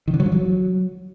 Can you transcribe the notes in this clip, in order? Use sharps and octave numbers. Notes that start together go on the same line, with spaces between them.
D#3
D3
F#3
F3
F#3